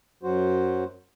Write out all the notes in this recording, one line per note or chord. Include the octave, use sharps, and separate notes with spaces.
F#2 F#3 F#4 C5